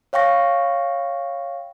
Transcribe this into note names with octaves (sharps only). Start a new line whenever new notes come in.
C#5 F5 G5 C#6 A#6